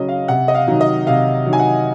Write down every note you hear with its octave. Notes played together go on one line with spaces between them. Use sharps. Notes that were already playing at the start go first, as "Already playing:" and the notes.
Already playing: C#3 F#3 C#4 D#5
F5
C3 F#5
D#5
F5
D#3 F#3
D#5
C3 F5
D#3 F#3
G#5
F#5